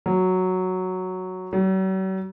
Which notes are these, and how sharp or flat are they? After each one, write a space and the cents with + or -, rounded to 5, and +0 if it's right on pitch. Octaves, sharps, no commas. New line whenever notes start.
F#3 +0
F#3 +45